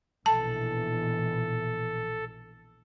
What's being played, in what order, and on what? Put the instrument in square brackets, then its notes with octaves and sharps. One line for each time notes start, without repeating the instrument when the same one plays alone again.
[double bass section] A#1 B2 E3 [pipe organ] A4 [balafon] A5